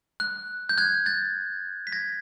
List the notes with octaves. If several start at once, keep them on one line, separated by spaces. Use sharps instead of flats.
F#6
G6
F#6 G#6
G6 A6
B6
G#6 A#6